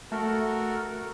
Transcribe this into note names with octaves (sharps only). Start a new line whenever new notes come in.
A3 F#4 A4 A#4